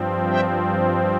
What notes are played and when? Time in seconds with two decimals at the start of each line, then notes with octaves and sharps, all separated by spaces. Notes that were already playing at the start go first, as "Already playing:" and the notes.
Already playing: G2 F3 C4
0.29 E5 G5